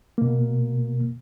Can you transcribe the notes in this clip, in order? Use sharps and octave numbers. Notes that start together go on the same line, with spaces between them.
B2 A#3